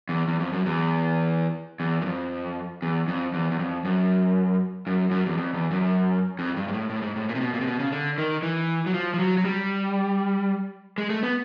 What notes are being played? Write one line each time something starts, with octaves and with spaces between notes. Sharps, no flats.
E2
E2
F2
F#2
E2
E2
F#2
F2
E2
F2
E2
E2
F2
F#2
F#2
F#2
E2
F2
E2
F#2
F2
G2
G#2
A2
A2
G#2
A2
A#2
C3
B2
A#2
C3
B2
C#3
D3
D#3
E3
F#3
F3
F3
F#3
F#3
G3
G#3
A3
B3